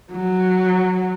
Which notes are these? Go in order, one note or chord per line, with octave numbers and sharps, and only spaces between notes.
F#3